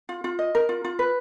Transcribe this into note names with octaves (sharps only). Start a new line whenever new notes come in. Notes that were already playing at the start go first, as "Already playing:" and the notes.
F4
F4
D#5
A#4
F4
F4
B4